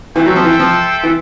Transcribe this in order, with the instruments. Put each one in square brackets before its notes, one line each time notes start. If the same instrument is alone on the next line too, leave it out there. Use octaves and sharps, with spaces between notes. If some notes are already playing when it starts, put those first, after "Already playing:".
[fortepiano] E3 [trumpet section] F4 A4 C5 E5 G5
[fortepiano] F#3
F3
E3
F3
E3